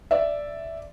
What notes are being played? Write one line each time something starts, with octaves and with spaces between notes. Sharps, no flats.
D5 E5